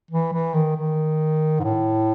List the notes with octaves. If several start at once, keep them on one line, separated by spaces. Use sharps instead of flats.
E3
E3
D#3
D#3
G#2
A2